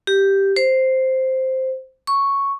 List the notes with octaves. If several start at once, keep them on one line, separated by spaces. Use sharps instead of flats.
G4
C5
C#6